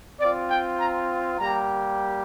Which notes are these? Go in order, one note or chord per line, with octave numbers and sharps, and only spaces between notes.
C4 F4 D5
G5
A#5
G3 A#3 G4 A#5